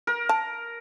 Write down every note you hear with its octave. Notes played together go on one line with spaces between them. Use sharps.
A#4
A5